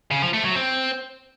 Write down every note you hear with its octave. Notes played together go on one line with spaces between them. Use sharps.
C#3
F3
A3
F#3
C4